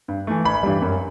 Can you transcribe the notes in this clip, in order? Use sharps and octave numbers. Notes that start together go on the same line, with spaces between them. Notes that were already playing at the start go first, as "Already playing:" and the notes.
G2
E3 A3
A1 B5
G2 E3 G3
F#2